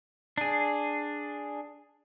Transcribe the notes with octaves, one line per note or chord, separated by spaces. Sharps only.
D4 G#4